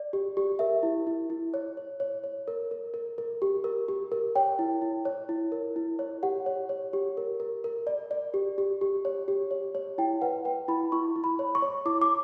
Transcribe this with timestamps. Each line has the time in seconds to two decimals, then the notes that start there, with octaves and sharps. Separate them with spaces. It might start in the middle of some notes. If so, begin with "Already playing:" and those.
Already playing: D5
0.13 G4
0.37 G4
0.59 A#4 E5
0.83 E4
1.07 E4
1.30 E4
1.54 C#5
1.77 C#5
2.00 C#5
2.24 C#5
2.48 A#4
2.71 A#4
2.94 A#4
3.18 A#4
3.42 G4
3.64 A#4
3.88 G4
4.12 A#4
4.35 C#5 G5
4.59 E4
4.82 E4
5.05 C#5
5.29 E4
5.52 A#4
5.76 E4
5.99 C#5
6.23 G4 F#5
6.46 C#5
6.69 C#5
6.93 G4
7.17 A#4
7.40 A#4
7.64 A#4
7.87 D5
8.11 D5
8.34 G4
8.58 G4
8.81 G4
9.05 C#5
9.28 G4
9.51 C#5
9.75 C#5
9.98 E4 G5
10.22 B4 F#5
10.45 B4 G5
10.68 E4 B5
10.92 E4 C#6
11.16 E4
11.24 B5
11.39 C#5
11.55 C#6
11.62 C#5
11.86 E4 D6
12.02 D6